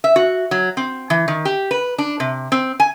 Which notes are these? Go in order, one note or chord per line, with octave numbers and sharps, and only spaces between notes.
E5
F#4
F#3
C4
E3
D#3
G4
B4
D4
C3
C4
G#5